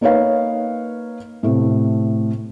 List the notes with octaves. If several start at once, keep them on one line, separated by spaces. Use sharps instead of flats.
A#3 D#4 B4 C#5 F5
A2 C3 A3